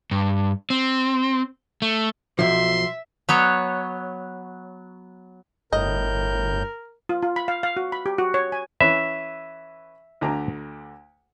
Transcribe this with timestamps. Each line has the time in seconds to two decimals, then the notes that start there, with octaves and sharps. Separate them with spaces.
0.11 G2
0.70 C4
1.82 A3
2.39 B1 F3 E5 C6
3.29 F#3 B3 C#5
5.73 G1 A2 A#4 D#5 G6
7.09 F4
7.22 F4
7.36 B5
7.48 F5
7.63 F5
7.77 F#4
7.92 B5
8.06 G4
8.18 F#4
8.34 C#5
8.52 G#5
8.81 E3 C#4 B4 E5
10.21 D2 D3 A#5